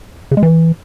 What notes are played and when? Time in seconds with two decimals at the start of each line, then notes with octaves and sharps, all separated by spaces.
0.31 C#3
0.37 G#3
0.43 E3